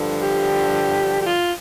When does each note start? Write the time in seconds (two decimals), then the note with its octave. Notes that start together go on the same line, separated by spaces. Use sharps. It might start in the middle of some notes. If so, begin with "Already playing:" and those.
Already playing: G2 D3 F3
0.21 G4
1.20 G4
1.26 F4